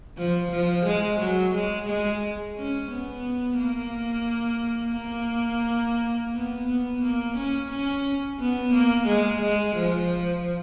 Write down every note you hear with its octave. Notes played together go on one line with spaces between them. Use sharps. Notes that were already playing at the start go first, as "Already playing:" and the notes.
F3
F3
G#3
F#3
G#3
G#3
C#4
B3
A#3
A#3
B3
B3
A#3
C#4
C#4
B3
A#3
G#3
G#3
F3